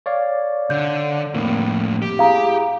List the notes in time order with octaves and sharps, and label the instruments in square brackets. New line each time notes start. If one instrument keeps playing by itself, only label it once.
[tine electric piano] C#5 D5 F5
[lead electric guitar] D3 [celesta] G6
[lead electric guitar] F2 A2 [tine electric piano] A#3 C4
[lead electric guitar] G4
[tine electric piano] E4 G#4 [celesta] F5 A#5